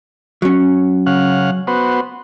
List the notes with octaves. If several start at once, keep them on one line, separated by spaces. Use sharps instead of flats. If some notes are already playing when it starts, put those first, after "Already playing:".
F#3 C#4
C#3 F5 F#5
B3 F#4 C5